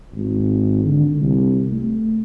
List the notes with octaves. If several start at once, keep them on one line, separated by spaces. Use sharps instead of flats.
G#1
D3
C2
A3